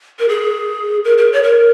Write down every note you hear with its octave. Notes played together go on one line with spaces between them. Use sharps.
A#4
G#4
A#4
A#4
C#5
A#4